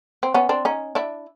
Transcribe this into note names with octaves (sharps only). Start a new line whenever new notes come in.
C4
B3 C#4
C4 D4
C#4 D#4
D4 E4